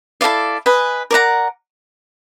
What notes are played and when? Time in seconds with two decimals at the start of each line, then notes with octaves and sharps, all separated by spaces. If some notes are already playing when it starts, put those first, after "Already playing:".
0.21 E4 A4 D5 F5
0.66 B4 D#5 G#5
1.11 A#4 D5 F#5 A#5